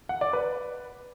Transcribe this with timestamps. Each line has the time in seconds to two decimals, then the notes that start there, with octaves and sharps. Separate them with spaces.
0.09 F#5
0.21 D5
0.33 B4